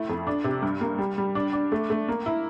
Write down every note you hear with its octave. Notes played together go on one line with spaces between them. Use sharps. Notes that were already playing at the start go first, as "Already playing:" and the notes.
Already playing: A3 E4
F2
D4
C3
G2
A#3
G3
G3
D4
D4
A3
A3
A#3
E4